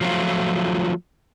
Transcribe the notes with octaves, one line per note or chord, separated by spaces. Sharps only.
F3 F#3 A3 F4